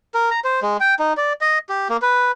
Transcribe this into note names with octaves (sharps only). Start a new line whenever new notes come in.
A#4
A#5
C5
G#3
G5
D#4
D5
D#5
G4
A#3
B4